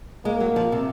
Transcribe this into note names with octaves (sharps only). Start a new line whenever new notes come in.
G#3 A#3
F#3
F3
C3